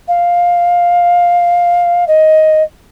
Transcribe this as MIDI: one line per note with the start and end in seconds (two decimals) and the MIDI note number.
0.08 2.05 77
2.08 2.63 75